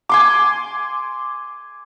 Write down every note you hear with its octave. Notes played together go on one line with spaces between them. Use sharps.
G#5 C6 D6